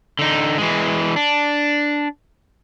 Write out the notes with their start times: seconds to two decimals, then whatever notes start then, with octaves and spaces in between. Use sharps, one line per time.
0.19 D3 D#4
0.58 E3 G#3
1.16 D4